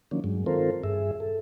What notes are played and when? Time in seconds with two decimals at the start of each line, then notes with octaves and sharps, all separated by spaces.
0.11 D#3 F3 F#3 A#3 C#4 D4
0.24 G2 F#3 G#3
0.46 D#3 C4 F4 A4 A#4 C5
0.84 G2 G#4 E5
1.20 A4